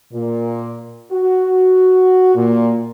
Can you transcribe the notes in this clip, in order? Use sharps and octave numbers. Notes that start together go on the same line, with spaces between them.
A#2
F#4
A#2